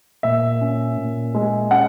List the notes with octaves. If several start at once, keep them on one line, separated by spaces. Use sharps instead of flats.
A#2 E5
C#4
A#2
G#3
C#4 F#5